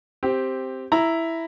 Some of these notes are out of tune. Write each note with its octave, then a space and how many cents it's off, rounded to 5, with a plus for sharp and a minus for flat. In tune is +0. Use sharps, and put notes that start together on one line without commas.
C4 +0 G4 +0
E4 +0 A#5 +0